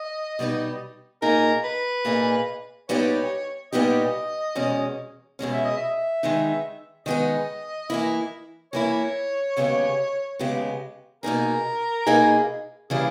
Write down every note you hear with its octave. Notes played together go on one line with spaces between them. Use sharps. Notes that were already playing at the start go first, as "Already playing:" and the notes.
Already playing: D#5
B2 G3 B3 D#4
A#2 A#3 D#4 G#4 A#4
B4
A#2 A#3 D#4 G#4
A#2 G3 B3 D#4 G4 C#5
A#2 G3 B3 D#4 G4 D#5
E2 B2 G#3 C#4
E2 B2 G#3 C#4
E5
D#5
E5
D#3 G#3 B3 D#4
D#3 G#3 B3 D#4 D#5
E3 A#3 E4
E3 A#3 E4 C#5
D#2 C#3 G#3 B3 G4
D#2 C#3 G#3 B3 G4
B2 A#3 D#4 G#4 A#4
B2 A#3 D#4 G#4
C#3 E3 G3 A#3 G#4